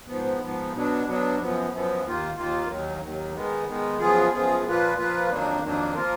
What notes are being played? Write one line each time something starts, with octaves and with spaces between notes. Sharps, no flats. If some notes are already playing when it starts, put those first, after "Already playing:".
G#2 F3 B3
G#2 F3 B3
B2 F#3 B3 D4
B2 F#3 B3 D4
F#2 F3 B3
F#2 F3 B3
D#2 D#3 A#3 F4
D#2 D#3 A#3 F4
D#2 D#3 F#3
D#2 D#3 F#3
D#3 G#3 B3
D#3 G#3 B3
F#2 F3 B3 F4 G#4
F#2 F3 B3 F4 G#4
A#2 F3 A#3 F4 B4
A#2 F3 A#3 F4 B4
F2 D#3 F#3 A#3 D4
F2 D#3 F#3 A#3 D4
F3 A#3 F4 A#4